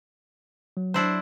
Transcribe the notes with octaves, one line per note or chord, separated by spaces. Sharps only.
F#3
D4 E4 C5